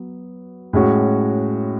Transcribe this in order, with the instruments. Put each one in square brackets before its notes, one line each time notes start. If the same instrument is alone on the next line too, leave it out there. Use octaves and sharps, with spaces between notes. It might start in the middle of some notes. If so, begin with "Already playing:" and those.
Already playing: [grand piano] F#3 B3
A2 G#3 C#4 F#4